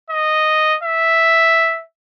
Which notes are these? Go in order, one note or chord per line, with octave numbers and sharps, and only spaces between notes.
D#5
E5